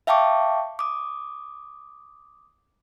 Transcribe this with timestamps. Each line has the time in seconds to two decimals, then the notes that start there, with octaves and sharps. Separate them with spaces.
0.07 E5 F5 G5 A5 C#6 D6
0.79 D6 D#6